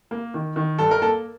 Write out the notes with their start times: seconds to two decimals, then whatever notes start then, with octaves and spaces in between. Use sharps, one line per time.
0.11 A#3
0.34 D#3
0.56 D#3
0.78 G2 A4
0.91 A#4
1.02 A#3 A4